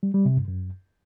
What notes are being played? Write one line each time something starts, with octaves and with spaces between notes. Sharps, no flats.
G3
G3
C3
G2
F#2